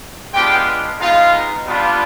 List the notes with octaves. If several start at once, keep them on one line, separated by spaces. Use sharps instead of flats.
G#3 B3 D4 F4 G4 G5
G#3 B3 D#4 F4 F5
G3 B3 D4 F4